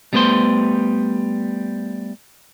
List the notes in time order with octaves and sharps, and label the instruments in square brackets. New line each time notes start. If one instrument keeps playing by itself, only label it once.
[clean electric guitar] G3 A3 B3 B4 C5 C6